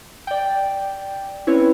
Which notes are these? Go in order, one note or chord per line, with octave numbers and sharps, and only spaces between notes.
D5 G5
C4 C#4 E4 B4 C#5